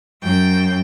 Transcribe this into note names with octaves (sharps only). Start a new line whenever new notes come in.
F#2 G5